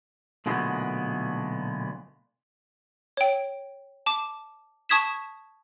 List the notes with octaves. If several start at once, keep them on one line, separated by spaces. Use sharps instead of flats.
B1 A#2 D3 G#3 A3 B3
C#5 G5
A5 D6
A5 C#6 D#6 G#6 B6 E7